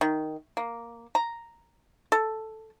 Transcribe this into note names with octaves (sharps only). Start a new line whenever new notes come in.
D#3
A#3
A#5
A4